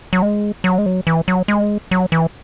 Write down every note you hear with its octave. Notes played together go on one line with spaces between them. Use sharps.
F#3
G#3
F#3
G#3
F#3
E3
F#3
G#3
F#3
E3